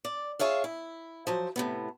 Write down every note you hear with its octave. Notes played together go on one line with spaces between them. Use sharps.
D5
F4 G#4 C#5 E5 F5
E4
F3 F#3 C5
A2 C3 B3